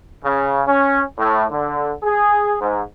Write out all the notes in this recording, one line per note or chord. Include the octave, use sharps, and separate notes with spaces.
C#3
C#4
A2
D3
G#4
G#2